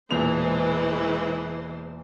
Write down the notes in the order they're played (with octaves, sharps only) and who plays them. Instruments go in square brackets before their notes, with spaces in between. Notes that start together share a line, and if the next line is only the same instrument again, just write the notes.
[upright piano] E1 A#2 F7 [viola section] E3 G#3 C5